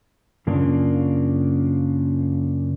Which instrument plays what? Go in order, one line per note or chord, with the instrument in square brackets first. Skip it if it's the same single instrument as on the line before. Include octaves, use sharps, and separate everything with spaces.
[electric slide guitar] F#2 C#3 A#3 D4 F4